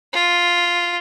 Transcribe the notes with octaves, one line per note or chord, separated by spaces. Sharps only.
F4